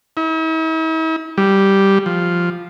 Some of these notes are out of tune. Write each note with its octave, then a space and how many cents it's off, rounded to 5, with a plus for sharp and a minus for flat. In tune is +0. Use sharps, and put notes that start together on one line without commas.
E4 -45
G3 -5
F3 +0